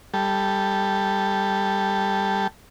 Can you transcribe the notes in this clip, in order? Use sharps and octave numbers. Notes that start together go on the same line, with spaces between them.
G3 A4